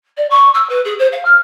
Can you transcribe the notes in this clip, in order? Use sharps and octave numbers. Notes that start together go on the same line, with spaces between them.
D5
C#6
E6
B4
G#4
C5
F5
F6